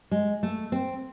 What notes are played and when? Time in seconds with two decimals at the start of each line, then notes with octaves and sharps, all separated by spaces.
0.11 G#3
0.43 A3
0.72 C4